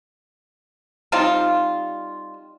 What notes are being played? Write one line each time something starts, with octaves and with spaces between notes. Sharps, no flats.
G3 C4 D#4 F4